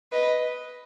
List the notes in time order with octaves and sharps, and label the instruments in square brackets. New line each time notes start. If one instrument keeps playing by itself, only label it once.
[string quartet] B4 D#5